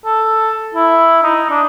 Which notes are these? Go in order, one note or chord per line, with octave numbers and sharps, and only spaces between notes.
A4
E4
D#4
D4